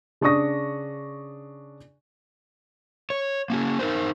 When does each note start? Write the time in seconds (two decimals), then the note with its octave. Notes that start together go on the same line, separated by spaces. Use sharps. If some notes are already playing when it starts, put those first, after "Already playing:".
0.21 C#3 D4 C#6 D#6 A#6
3.10 C#5
3.50 A#3 C#4 F#4
3.79 D#4 A#4 C5